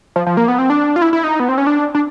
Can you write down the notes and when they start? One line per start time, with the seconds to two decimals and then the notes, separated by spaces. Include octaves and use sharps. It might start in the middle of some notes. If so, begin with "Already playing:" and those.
0.16 F3
0.27 F3
0.37 A#3
0.48 B3
0.59 C4
0.70 D4
0.96 F4
1.02 E4
1.13 E4
1.24 D#4
1.40 B3
1.49 C4
1.58 C#4
1.67 D4
1.95 D4